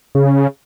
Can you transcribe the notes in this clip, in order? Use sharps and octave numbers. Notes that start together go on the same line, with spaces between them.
C#3